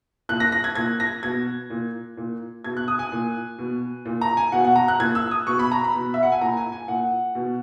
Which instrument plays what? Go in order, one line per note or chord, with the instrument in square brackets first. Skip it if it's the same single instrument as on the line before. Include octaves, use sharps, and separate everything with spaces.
[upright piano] A#2 F#6
A#6
A#6
G#6
A#2 G#6
A#6
B2 G#6
A#2
A#2
B2 G#6
F#6
D#6
G#5
A#2
B2
A#2
A#5
G#5
B2 F#5
F#5
A#5
F#6
A#2 G#6
E6
D#6
B2 C#6
B5
A#5
B5
B2
E5
F#5
G#5
A#2 A#5
G#5
G#5
A#2 F#5
B2